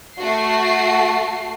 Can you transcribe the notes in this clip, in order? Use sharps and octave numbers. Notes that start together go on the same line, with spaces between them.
A3 F#4 C7